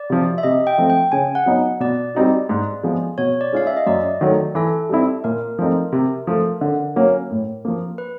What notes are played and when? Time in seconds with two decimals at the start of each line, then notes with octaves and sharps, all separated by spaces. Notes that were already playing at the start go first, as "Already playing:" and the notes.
Already playing: D5
0.10 C3 F3
0.38 E5
0.43 C3 D#5
0.67 G5
0.78 F3 A3 C4
0.90 G5
1.12 C#3 G#5
1.35 F#5
1.46 F#3 B3 D#4
1.80 B2 D5
2.15 G3 C4 D#4 F#4
2.49 G#2
2.83 F3 G#3 B3
3.18 B2 C#5
3.41 D5
3.53 G#3 C#4 F4 F5
3.67 E5
3.77 D#5
3.87 F#2 D5
4.21 D#3 F#3 A3
4.55 E3 A4
4.89 G3 C4 E4
5.24 A#2 A#4
5.59 F3 A3 C4 D#4
5.93 C3
6.27 F3 A3
6.61 D3
6.96 F#3 A#3 C#4
7.31 A2
7.65 F3 A#3
7.98 B4